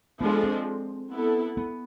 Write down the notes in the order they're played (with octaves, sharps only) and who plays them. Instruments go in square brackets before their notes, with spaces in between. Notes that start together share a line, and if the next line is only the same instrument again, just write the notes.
[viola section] F3 G#3 D4 A4 [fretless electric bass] B3
[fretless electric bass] C4
[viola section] B3 E4 A4
[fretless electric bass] B3